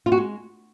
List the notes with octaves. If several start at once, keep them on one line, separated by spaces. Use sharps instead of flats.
F4
F#4
G#3